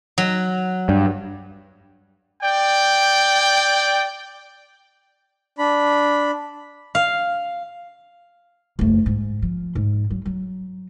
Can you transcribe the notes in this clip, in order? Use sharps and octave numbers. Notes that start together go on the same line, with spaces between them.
F#3
G2
D5 G5
D4 B5
F5
F#1 A3
G#2
F3
G#2
F#3
F#3